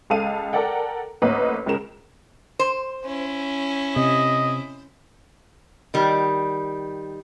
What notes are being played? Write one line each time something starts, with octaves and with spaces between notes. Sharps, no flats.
C#2 A4 F5 D#7
A4 A#4 D5 F#5 G5
A1 D2 A#3 B4 C#5 D#5
C#2 C#3 A#4 E7
C5
C#4 E4
C3 D#5
D#3 G3